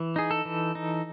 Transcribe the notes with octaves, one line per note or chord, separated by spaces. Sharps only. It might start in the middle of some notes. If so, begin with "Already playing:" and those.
Already playing: E3
D#4 G#4
A4
E3
D#4